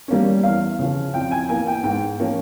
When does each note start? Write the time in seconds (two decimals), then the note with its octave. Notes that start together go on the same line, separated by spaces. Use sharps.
0.08 G3 A#3 C#4
0.43 E2 F5
0.79 C#3 F3
1.14 F2 G5
1.31 G#5
1.49 E3 A#3 G#5
1.67 G5
1.84 G#2 G5
2.20 F3 A#3 C#4